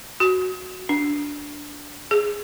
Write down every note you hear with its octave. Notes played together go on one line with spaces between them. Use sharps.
F#4
D4
G#4